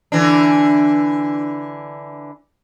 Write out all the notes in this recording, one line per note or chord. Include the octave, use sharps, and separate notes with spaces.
D3 E3 D4